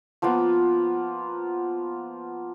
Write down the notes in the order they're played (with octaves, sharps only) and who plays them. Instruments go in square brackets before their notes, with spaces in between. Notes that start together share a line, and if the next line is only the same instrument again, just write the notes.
[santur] F3 A#3 B3 F4